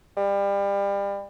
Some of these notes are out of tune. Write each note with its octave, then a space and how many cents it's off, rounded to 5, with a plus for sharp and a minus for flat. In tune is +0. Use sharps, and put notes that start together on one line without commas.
G3 +30